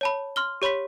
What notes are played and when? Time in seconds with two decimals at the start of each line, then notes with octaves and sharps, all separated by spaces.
0.01 C#5 A5 B5
0.36 C6 F6 G7
0.62 G4 C#5 B5 C6 B6